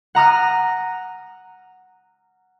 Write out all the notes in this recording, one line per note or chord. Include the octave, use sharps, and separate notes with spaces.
F#5 A#5 D#6 F6